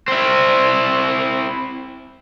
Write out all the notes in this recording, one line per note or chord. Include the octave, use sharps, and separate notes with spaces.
C4 E4